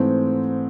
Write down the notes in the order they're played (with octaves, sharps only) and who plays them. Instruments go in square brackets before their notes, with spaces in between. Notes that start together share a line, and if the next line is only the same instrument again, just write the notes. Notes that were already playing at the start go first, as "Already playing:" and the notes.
Already playing: [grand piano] G#2 E3 A3 C4